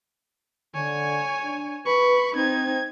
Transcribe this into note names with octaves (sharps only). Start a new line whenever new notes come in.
D3 C#5 G#5
D4
B4 B5 C#6
C4 D#4 G#6